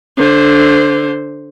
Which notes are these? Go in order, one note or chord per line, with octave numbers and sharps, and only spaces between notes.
D3 C5